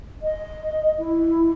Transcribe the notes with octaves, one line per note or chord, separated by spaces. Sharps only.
D#5
E4